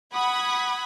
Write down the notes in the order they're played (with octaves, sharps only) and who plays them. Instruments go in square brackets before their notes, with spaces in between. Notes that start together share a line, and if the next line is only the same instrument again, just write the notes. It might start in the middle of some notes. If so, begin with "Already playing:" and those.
[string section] F#5 B5 G#6 [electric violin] D#6